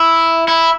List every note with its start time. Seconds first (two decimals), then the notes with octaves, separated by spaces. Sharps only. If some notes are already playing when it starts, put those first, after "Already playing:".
Already playing: E4
0.48 E4